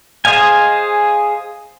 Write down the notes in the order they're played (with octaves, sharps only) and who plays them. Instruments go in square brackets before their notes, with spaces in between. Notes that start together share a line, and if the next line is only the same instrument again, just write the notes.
[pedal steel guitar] G#4 C5 D#5 F5 G#5